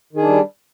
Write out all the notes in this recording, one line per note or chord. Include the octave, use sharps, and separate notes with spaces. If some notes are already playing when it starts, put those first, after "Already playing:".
D#3 G3 D4 G#4